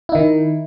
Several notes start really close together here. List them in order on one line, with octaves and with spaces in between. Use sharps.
E4 D#4 D#3